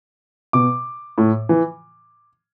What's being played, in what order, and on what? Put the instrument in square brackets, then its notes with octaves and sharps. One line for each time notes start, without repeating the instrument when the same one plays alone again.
[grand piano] B2 D6
A2
E3